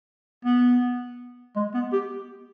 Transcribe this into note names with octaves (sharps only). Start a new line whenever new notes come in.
B3
G#3
B3
G4